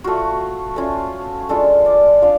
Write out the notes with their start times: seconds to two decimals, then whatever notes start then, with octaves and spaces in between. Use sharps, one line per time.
0.04 A3 F4 F#4
0.76 A3 C#4 F4
1.49 G#3 D4 F4 A4
1.86 D5
2.22 D4 F4 F5